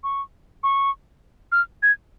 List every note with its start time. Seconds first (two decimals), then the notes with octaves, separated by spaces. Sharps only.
0.04 C#6
0.63 C#6
1.52 F6
1.83 G#6